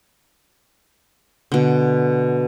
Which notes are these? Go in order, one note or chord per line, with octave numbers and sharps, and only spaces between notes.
B2 D3